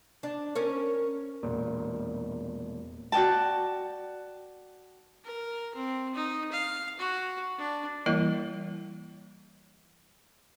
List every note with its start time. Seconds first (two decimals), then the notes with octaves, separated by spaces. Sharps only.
0.23 D4
0.55 C#4 A#4 C#5
1.43 E1 A#2
3.12 F#4 D5 G5 A5
5.24 A#4
5.75 C4
6.14 D#4
6.52 F5
6.98 F#4
7.58 D4
8.06 E3 G3 A#3 E4 A#4 D#5